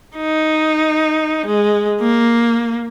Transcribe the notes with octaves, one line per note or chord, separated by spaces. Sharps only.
D#4
G#3
A#3